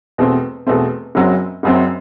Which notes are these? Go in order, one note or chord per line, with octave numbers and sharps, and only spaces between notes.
E2 B2 A3 C4
E2 B2 A3 C4
F#1 F#2 F#3 C4
F#1 F#2 F#3 C4